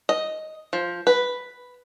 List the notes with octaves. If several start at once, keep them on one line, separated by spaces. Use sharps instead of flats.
D#5
F3
B4